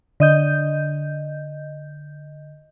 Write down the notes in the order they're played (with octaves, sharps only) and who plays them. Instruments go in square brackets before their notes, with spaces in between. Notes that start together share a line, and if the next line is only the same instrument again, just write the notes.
[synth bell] D3 D#5 G6